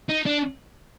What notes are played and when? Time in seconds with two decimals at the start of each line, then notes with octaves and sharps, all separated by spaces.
0.09 D#4
0.26 D4